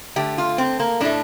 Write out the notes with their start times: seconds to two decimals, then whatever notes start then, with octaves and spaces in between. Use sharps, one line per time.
0.16 D3 A3 G4
0.38 F4
0.58 C4
0.80 A#3
1.01 A2 A3 D4